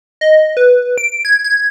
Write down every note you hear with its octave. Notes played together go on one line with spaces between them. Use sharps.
D#5
B4
D7
G#6
G#6